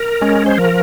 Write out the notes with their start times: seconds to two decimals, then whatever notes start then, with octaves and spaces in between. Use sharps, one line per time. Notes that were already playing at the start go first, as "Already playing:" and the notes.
Already playing: A#4
0.21 G#3 C#4
0.46 C5
0.58 F3 A#4